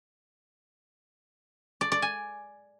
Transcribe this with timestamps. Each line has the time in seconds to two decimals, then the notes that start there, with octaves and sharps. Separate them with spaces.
1.81 D5
1.92 D5
2.02 G#5